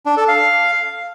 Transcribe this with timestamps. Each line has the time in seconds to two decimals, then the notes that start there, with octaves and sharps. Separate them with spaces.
0.06 D4
0.17 A4
0.28 F5